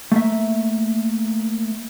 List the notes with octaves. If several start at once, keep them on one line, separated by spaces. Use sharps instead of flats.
A3 A#3 E5